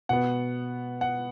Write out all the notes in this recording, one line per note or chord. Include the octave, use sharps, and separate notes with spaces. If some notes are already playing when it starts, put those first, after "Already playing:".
B2 B3 F#5
F#5